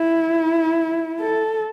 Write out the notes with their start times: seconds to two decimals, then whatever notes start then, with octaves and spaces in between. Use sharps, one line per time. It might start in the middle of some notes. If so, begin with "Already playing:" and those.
Already playing: E4
1.20 A4